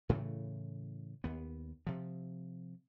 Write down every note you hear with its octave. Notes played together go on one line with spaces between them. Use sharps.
A2 C#3 E3 A3
D#2 B3
C3 F3